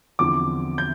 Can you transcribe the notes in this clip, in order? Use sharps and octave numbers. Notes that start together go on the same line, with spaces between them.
E2 D3 F3 C4 D6
G6